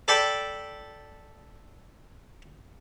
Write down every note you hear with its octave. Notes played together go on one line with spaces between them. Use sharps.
A4 D5 G5 A5 B5